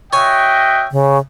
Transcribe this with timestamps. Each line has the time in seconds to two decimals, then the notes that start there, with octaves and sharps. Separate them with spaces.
0.13 F#4 C#5 D#5 E5 G5 G#5
0.91 C#3